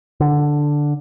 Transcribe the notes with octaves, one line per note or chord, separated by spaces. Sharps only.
D3